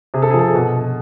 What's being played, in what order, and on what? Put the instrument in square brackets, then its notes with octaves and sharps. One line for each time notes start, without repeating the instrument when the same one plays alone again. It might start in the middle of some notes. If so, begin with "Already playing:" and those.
[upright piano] C3 G#4
A4
G#4
F3
A4
G#4
B2